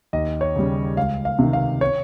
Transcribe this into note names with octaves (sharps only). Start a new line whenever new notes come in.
D#2 D#5
C#5
C#3 G3
C#2 F5
F5
C3 D#3
F5
C#5